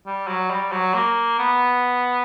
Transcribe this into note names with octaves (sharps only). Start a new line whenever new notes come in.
G3
F#3
G3
F#3
A#3
B3